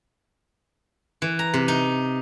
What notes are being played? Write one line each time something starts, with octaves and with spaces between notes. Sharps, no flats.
E3
A#5
C3
D#4